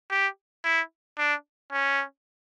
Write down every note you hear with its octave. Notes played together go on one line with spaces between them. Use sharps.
G4
E4
D4
C#4